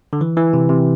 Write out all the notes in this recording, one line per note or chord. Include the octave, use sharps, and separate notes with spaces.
D3
E3
E3
C3
C3